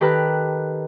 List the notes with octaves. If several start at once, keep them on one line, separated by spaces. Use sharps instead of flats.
D#3 G4 A4 B4 A#5 F#6